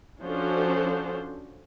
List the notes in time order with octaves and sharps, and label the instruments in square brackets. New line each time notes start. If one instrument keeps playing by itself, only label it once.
[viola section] F3 C#4 D4 F#4 A4 C5